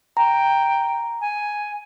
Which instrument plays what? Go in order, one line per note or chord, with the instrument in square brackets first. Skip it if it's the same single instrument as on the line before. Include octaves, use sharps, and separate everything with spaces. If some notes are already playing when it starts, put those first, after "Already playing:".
[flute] G5 [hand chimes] A#5
[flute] G#5